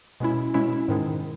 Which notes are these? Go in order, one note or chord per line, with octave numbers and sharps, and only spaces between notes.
B2 G#3 C#4 E4
B2 G#3 C#4 E4
G#2 D#3 G#3